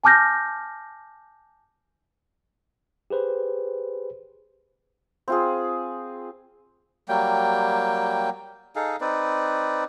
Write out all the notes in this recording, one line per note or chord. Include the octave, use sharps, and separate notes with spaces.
G#5 A5 D6 F6 G6 A#6
G4 G#4 B4 C5
C4 F4 G#4
F#3 G3 A#3 G5
D#4 G#4 A4 F5
C4 D#4 B4 D5